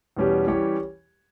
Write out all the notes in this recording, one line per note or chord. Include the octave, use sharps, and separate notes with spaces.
E2 B2 G3 C#4 G4
E3 G3 C#4 G4 C#5